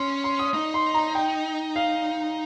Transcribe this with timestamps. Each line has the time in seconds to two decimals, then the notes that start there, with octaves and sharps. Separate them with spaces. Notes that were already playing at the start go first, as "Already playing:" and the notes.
Already playing: C#4 C6
0.24 C6
0.39 D#6
0.54 D#4
0.74 C6
0.94 A#5
1.15 G5
1.76 F5